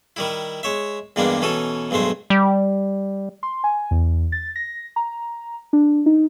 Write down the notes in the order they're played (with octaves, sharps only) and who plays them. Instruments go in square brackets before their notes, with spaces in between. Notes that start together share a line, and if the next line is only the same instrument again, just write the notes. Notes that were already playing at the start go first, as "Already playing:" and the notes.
[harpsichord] D#3 G3 E4
G#3 C#5 E5
E2 G2 G3 G#3 A#3 D4
B2 E3 C#4 D#4 A4
B1 G2 G#3 A3 C5
[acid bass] G3
[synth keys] C6
G#5
E2
A6
A#6
A#5
D4
D#4